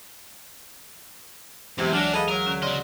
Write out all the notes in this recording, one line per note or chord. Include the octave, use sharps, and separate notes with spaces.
E2 C3 E3 F#3 G#3
D2 F#3 D4 A#6
G#4 A4 B4 D#5 F5
F#3 A#4
D3 C#4
C#3 F#4 D5 D#5 C6